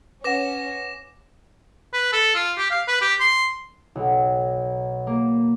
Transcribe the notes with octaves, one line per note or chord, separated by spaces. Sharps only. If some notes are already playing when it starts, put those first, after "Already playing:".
C#4 B4 F#5 D6 A#6 E7
B4
A4
F4
G4
F5
B4
G4
C6
B1
A#3